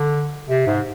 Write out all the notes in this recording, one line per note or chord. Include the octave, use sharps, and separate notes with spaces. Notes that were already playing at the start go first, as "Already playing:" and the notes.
Already playing: D3
C3
G#2